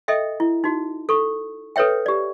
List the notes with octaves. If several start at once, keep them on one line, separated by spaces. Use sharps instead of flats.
A4 D#5 E5 G5
E4
D#4 F#4
A4 C#6
A4 B4 C#5 E5 G5
G4 D5